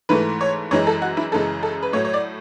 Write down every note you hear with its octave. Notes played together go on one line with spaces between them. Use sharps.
G#2 E3 A3 B4
C#5
F#2 E3 G#3 C#5
A4
F#4
E4
F#2 C#3 E3 G#3 A4
A4
B4
A2 F#3 A3 C#5
C#5
D5